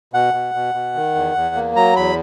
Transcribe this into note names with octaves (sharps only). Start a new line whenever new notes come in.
B2 F#5
B2
B2
B2
D#3
E2
E2
A#3
F#3 A#5
E2 B5